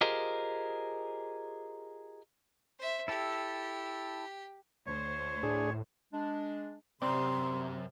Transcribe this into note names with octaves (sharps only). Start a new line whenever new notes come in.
F4 G4 G#4 A#4 C5 D#5
C5 E5
E4 G4 A4
D2 C5 C#5
A2 D4 G#4
G#3 D4
B1 F#2 C3 C4 D5 C6